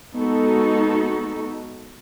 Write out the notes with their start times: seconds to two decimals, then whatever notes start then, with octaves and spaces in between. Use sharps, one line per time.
0.15 G#3 B3 D#4 F#4 A4